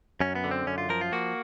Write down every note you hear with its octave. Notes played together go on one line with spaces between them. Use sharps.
F#2 C#4
B3
D3
C4
F#2 C#4
F4
F3 A#4
F4
A#3 F#4